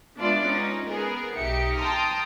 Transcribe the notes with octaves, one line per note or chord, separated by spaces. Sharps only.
G#3 B3 D4 E4 F4 D5
C#4 D#4
B3 G#4 A#4
B1 D#4 G4 E5 C#7
G5 A5 A#5 C6 D#6 F6